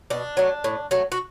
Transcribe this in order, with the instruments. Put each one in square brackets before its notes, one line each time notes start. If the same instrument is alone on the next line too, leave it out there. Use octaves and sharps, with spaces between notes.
[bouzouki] B2 D4
F#3 A3
A2
F#3 A3
F#4